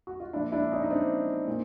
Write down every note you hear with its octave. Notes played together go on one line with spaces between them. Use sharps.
F#4
F4
A#2 F3 D4 E4
D4 E4
C#4 D#4
D#4
C4 D4
A#2